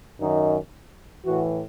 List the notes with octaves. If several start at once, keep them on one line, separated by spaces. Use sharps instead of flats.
F#2 D#3 D#4
A2 E3 F#4